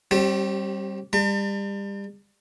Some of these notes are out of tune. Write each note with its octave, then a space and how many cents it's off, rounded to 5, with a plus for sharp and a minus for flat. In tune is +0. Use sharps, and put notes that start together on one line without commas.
G3 +0 C4 +40 G4 -30
G3 +30 A5 +45